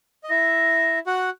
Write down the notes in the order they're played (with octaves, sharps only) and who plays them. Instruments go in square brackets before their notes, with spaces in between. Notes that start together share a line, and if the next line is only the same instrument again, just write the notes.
[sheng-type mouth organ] D#5
[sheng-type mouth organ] E4 E5 [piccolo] A#6
[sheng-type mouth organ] F#4 F#5